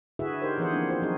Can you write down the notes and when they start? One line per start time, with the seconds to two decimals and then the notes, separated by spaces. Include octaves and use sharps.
0.19 D3 E4 F#4 G#4 B4 E5
0.42 D#4 G4 A#4 C5
0.58 E3 F3 B3 G#4 C5 F#5
0.72 F3 A#3 C4 D4
0.90 F4 C5
1.02 F3 F#3 C4 D#4 F#4 G#4